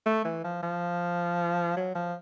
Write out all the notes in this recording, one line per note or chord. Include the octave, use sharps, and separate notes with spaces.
A3
E3
F3
F3
F#3
F3